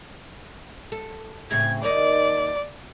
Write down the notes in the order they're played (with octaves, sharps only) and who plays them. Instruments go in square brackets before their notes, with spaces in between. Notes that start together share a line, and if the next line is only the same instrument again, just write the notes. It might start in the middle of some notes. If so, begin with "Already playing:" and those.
[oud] A4
[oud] A2 C#3 C4 [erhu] G#6
[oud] D#2 A#3 D#4 [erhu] D5